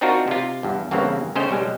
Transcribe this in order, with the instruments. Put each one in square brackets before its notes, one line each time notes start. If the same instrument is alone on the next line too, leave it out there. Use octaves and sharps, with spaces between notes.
[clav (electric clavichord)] C4 D4 D#4 F4 F#4 A#4
C3 F4
E2 G2
E2 G2 C#3 E3 A#3 C4
C#3 A3 C#4 C5 D#5 G5
B1 G3 G#3